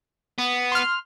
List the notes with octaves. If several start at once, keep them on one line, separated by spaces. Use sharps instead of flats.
B3
C6 F6